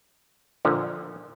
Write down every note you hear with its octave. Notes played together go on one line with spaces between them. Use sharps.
A#2 D3 F3